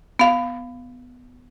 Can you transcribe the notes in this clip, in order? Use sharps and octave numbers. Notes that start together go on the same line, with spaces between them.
B3 F5